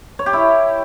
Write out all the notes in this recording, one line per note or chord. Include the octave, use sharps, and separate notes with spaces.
C#5
G4
E4